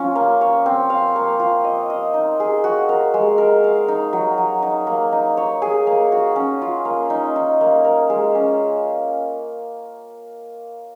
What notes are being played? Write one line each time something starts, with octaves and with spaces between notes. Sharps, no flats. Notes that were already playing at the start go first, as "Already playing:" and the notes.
Already playing: F3 C#4 F4
A#3
C#5
C4
F5
A#3
F4
D#5
D#5
D#4
G#4
F#4
A#4
G#3
A#4
F5
D#4
F#3
F#3
D#4
A#3
D#4
C#5
G#4
A#3
F#4
C#4
F4
A#3
D#4
D#4
A#3
A#4
G#3
C#4